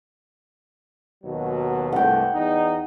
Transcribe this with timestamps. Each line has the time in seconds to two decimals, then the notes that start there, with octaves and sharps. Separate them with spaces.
1.23 D#2 B2 F#3
1.92 C2 G2 A3 F#5 G5
2.35 E2 D#4